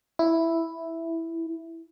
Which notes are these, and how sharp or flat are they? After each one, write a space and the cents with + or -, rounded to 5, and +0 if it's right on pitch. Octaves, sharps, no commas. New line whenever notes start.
E4 +0